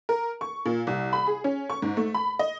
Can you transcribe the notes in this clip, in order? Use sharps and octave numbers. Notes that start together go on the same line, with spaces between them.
A#4
C#6
A#2
C2
B5
G#4
C#4
C#6
G#2
A3
B5
D#5